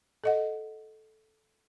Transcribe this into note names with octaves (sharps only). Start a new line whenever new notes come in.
A4 D#5 F#5